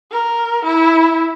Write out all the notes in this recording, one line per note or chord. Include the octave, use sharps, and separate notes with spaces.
A#4
E4